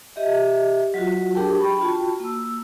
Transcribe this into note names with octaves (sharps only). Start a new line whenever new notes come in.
G4 D#5 E5
F#3 F4 F#4
D4 G4 G#4 A#4 G5 A5
G5 B5 C#6
F4 F#4 A5
A#3 E6